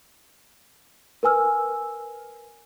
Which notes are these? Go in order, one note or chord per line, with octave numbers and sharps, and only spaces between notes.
A#4 B4 G#5 E6 F6